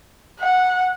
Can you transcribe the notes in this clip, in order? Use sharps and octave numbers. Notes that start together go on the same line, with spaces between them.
F#5